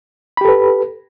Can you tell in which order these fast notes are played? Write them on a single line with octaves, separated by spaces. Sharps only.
B5 G4 A4 B4